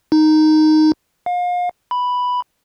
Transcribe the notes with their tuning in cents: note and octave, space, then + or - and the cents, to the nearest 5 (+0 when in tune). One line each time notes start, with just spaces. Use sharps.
D#4 -5
F5 +35
B5 +0